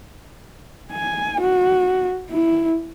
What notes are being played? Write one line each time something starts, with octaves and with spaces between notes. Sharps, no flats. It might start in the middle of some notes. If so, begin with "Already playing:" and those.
G#5
F#4
E4